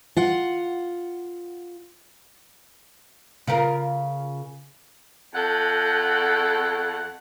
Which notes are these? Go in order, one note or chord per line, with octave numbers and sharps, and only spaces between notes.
F4 F#5
C#3 F4 A#4
F2 A4 F#5